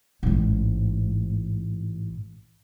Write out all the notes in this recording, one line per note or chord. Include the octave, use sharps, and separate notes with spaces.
A1 G#2